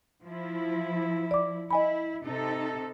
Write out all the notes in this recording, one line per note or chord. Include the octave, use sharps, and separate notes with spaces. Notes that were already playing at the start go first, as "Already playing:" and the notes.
F3 E4
D5 D6
E4 D#5 G#5 B5
C3 D#4 A4